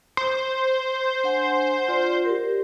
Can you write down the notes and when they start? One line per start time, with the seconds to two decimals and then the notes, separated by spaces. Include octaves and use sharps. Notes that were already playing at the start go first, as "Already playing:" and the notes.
0.17 C5
1.24 D4 F#5 G#5
1.88 F4 D5
2.25 G4 A#4